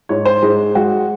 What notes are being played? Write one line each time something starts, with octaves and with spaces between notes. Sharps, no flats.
G#2 C#5
C5
G#2 G#4
G#3 F#4